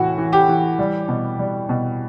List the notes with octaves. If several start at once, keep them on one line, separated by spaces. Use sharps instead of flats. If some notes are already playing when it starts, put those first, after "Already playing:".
Already playing: A2 E3 F#4
E3
G4
E3
G3
B2
G3
B2